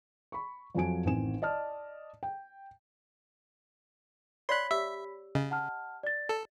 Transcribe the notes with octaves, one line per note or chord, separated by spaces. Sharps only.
B5 C#6
F2 F3 F#3 F#4 G#5 D7
A1 D#3 C4 G#5 E7
D5 D#5 A5 F6
G5
C#5 D5 F5 B5 C6 F#6 B6
G4 E5 E6
C#3 D#5
F#5 A5 F6
D5 A6
A4